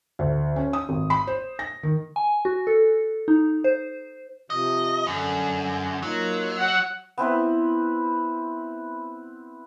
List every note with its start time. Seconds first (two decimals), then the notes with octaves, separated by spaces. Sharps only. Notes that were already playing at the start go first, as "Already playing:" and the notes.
0.19 D2
0.56 C#4
0.73 D#6
0.89 G#1
1.10 B5
1.27 C5
1.59 A#6
1.83 D#3
2.16 G#5
2.45 F#4
2.67 A4
3.28 D#4
3.64 C5
4.50 C3 F3 D#5
5.07 F#2 D3
6.02 F#3 A#3 D#4 F4
6.58 F#5
7.18 B3 C4 E4 B4